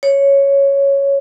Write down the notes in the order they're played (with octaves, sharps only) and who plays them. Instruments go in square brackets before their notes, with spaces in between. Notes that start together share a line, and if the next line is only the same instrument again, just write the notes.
[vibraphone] C#5